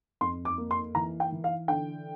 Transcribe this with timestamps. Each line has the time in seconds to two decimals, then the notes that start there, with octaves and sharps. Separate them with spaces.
0.21 F2 C6
0.45 D6
0.58 A#3
0.71 C6
0.95 E3 A#5
1.20 G5
1.32 E3
1.44 F5
1.68 D3 G5